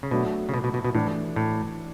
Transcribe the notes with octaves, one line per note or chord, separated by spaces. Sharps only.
C#3
B2 F#3 A3 D4
C#3
B2
B2
B2
B2
A2 E3 A3 D4
A2